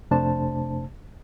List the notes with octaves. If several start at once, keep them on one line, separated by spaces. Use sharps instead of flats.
F2 C3 A3 D4 C5 A5